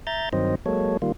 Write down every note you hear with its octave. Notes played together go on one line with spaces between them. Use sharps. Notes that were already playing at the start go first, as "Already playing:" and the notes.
E5 A#5 G6 A6
G2 D#3 F#3 C4 C5 D#5
F#3 G#3 A#3 A4 C#5
D#3 G3 A#3 F4